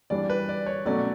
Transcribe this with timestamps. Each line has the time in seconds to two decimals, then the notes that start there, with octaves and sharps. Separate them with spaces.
0.10 G2 E3 G3 D4 D5
0.30 B4
0.49 D5
0.66 C#5
0.85 B2 F#3 A3 C#4 D5